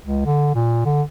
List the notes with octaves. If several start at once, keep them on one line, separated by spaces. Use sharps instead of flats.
C#2
D3
A#2
D3